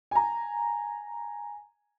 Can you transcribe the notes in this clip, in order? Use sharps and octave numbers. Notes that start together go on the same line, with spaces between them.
G#5 A#5